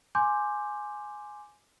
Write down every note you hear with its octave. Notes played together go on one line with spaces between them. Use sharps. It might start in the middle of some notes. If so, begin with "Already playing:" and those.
G#5 C6 D6 G6